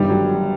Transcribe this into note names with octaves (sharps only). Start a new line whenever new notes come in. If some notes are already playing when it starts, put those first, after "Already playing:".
Already playing: G1 G2 D#3 G3
F#3